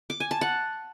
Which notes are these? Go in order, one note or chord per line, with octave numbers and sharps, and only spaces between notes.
D6
G#5
A5
F#5